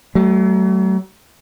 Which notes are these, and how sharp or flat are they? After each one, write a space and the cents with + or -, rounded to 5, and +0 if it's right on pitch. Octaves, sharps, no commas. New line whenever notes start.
F#3 +40 A3 +0